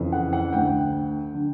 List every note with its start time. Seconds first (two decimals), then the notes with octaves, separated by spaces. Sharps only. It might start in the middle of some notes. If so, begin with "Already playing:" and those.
Already playing: F2 C#3 E3
0.12 F#5
0.33 F#5
0.53 D2 D3 G5
1.35 D3